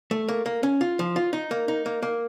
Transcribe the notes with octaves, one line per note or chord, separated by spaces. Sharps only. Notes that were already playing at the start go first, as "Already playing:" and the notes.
A3
A#3
A#3
C#4
F4
F3
F4
D#4
A#3
D#4
A#3
A#3